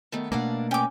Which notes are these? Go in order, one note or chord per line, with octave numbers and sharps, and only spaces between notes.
D#3 A3 B3
B2 A3 A#3 D4 F5 F#5
C#4 G5 D6